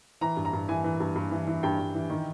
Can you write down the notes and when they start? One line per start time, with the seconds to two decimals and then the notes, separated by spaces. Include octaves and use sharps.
0.21 E3 A#5
0.37 G2
0.45 A#5
0.53 G2
0.68 E3 G#5
0.84 E3
1.00 G2
1.16 G2
1.32 E3
1.47 E3
1.63 G2 G5
1.79 G2
1.94 E3
2.10 D#3